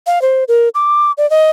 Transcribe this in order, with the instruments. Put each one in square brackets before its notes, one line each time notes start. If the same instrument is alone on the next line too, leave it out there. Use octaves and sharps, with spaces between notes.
[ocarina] F5
C5
A#4
D6
D5
D#5